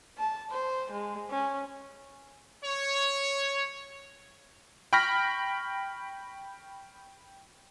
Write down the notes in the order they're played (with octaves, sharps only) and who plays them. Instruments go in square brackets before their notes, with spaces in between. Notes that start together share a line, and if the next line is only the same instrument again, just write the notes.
[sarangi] A5
C5
G#3
C#4
[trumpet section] C#5
[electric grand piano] G5 B5 C#6 F6 A#6 B6